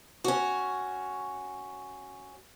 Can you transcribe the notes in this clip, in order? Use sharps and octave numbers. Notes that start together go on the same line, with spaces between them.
C#4 F#4